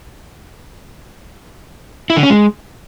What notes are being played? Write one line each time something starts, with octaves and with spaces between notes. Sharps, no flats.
E4
D3
C#4
G#3